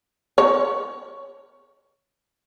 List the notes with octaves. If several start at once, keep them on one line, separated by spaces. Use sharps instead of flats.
C#5